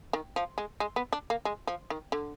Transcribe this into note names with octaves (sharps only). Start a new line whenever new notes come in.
D#3
F3
G#3
G#3
B3
D4
A#3
G#3
F3
D#3
D3